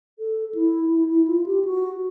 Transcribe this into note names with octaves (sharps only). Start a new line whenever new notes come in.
A4
E4
E4
E4
F4
G4
F#4